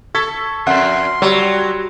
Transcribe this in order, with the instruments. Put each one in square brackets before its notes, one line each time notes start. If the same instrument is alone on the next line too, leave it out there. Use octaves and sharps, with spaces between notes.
[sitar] A4 [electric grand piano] C#6 G#6 B6
[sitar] F2 [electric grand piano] E5 F#5 F#6 [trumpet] C6
[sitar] F#3 [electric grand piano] G3